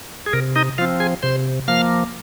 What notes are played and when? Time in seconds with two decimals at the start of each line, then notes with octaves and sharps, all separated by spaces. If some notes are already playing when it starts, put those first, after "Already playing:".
0.26 G#4
0.33 C3 A#4
0.56 D#4 D#5
0.78 F3 C4 F4 F5
1.00 G#4 G#5
1.22 C3 C5 C6
1.68 F3 A#3 F5 F6